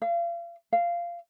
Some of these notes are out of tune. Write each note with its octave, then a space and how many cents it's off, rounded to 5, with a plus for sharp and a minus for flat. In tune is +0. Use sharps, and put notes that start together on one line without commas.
F5 -35
F5 -15